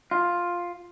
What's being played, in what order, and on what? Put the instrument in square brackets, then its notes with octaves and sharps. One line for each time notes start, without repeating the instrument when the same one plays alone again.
[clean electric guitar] F4